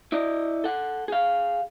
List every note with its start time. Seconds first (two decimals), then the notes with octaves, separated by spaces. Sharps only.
0.12 E4 D5 D#5
0.64 A4 F#5
1.08 G#4 F5